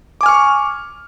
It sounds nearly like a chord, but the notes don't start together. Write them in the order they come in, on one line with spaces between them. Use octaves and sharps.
D6 G#5 F6 C#6